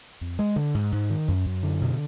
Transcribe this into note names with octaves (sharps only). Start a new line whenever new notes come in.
F2
G#3
D3
G#2
G#2
D#3
F#2
F#2
D3
B2